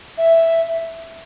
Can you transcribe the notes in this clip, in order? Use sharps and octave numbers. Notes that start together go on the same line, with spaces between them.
E5